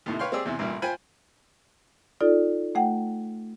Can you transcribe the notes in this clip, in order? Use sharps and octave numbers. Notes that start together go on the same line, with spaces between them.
D#2 A2 C3
B4 C#5 F5 G5 C6
C4 G4 G#4 D5 E6
E2 C3
A1 G2 A#2
F4 C5 G5 G#5 B5
D#4 F4 A4 D5
A3 F#5 G5